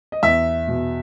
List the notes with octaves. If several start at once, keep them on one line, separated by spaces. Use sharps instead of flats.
D#5
E2 E5
B2